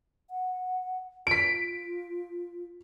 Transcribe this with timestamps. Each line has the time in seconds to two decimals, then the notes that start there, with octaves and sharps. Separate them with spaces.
0.30 F#5
1.27 F4 B6 D7